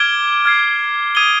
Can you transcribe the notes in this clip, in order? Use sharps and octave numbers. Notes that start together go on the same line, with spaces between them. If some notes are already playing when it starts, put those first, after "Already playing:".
Already playing: D6 F6 G#6 D7 G7
F6 G#6 C7
D#6 G#6 D#7 G7